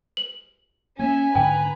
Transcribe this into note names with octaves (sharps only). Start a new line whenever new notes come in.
F#7
A#3 C#4 E5 G#5
G#2 D3 B4 G5 A#5